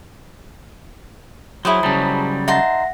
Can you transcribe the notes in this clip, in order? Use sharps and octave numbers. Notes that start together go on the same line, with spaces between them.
F#3 E4 G#4 C5
C#3 F#3 G3 A5 A#5
D#4 E5 F#5 A5 C6 A#6